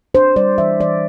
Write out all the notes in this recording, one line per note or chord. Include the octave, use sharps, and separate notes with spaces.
D4 C5
G3 D5
E3 E5
E3 D5